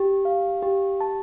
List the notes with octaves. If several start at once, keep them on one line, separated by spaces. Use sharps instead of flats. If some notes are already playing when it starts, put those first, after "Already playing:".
Already playing: G4
F5
G4
A5